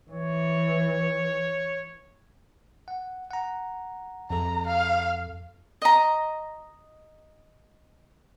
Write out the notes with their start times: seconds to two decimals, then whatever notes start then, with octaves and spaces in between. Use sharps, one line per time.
0.11 E3 C#5
2.88 F#5
3.31 F#5 A#5
4.30 F2 A4 A#5
4.67 F5
5.82 D#5 A#5